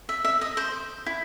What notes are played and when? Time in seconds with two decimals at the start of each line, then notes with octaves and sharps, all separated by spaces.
0.09 E5
0.24 E5
0.41 D#5
0.57 C5
1.06 E4